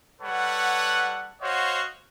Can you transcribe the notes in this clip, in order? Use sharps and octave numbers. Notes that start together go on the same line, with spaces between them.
G3 A4 B4 C#5 F#5
F#4 C5 C#5 D#5 F5 F#5